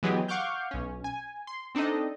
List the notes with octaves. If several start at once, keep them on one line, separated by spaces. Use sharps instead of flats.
E3 F#3 G#3 B3 G4 G#4
F5 F#5 C#6 D6 F6 G6
B1 C#4
G#5
C6
C4 D4 D#4 A4 D#5